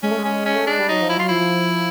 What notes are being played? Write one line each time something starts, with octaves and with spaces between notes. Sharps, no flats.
G#3 C#4
A3
G#3
C#4
C#4
A3
G#3 D4
G3
F#3 D#4
F3
E4
F#3 F4
F3 E4